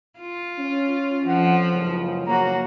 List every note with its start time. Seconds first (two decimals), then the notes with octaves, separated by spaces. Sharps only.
0.20 F4
0.58 C#4
1.26 F2 F3 F#5
1.72 F#1 C#2 C#3
2.26 F#1 A#3 F#4 C#5 A#5